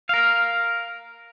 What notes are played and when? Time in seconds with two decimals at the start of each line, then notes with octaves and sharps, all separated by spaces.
0.09 A#4 F5